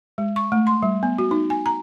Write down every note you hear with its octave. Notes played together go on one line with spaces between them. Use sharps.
G#3
C#6
A3
C6
G3
B3
F#4
D#4
G#5
A#5